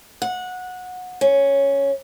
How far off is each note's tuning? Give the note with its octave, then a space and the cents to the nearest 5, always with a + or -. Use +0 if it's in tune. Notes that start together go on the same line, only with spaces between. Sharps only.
F#5 -20
C#4 +0